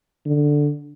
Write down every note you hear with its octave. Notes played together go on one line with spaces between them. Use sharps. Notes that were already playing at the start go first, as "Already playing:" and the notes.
D3